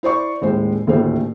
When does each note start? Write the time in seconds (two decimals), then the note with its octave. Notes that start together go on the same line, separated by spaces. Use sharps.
0.03 E4 C5 D5 C#6
0.41 D#1 A2 G#3 C5
0.87 D#1 D2 A2 A3 C5